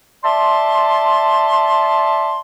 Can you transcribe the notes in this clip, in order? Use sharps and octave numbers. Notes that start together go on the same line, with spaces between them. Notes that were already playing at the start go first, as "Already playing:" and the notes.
D5 E5 A5 C6